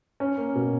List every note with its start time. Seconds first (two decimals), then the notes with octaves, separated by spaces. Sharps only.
0.20 C#4
0.38 A#3
0.55 B2